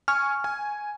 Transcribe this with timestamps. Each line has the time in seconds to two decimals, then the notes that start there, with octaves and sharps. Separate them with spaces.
0.08 G#5 C#6 F6
0.44 G#5